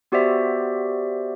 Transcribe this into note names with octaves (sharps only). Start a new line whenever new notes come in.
B3 F#4 G4 C5 D5 E5